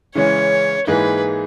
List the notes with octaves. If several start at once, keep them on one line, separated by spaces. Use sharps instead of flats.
C#3 E3 G#3 C#4 C#5
G#2 E3 A#3 D#4 G#4 B4